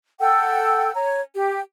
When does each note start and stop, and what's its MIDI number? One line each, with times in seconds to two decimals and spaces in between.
0.20 0.93 69
0.20 0.93 78
0.20 0.93 79
0.20 0.93 88
0.95 1.21 73
0.95 1.21 82
1.34 1.59 67